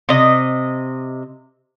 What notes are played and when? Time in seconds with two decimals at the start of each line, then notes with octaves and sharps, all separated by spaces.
0.09 C3 D#5